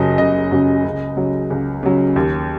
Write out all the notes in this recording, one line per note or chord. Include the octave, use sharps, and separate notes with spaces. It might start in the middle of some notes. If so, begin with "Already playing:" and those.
Already playing: F#1 F#2 C#3 F#3 D#5
F#1 D#5
F#2 C#3 F#3
C#2
C#3 F#3
C#2
C#3 F#3
D#2